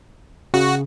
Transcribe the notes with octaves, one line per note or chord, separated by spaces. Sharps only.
C#3 F#4